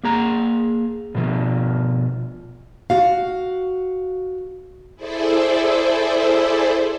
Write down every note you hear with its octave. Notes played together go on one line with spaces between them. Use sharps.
A#3 G#4 A#5
B2 F3 F4
F#4 F5
E4 G#4 A4 C5 D5 E5